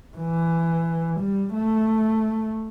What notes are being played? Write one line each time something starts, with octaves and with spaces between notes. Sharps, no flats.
E3
G3
A3